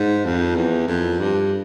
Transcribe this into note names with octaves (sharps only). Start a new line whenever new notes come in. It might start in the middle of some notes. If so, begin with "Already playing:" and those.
Already playing: G#2
F2
E2
F2
G2